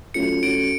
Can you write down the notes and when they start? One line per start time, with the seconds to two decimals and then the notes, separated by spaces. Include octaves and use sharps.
0.14 F#3 A3 C#4 F4 A4 C#7
0.43 F#3 C#4 F#4 A4 D7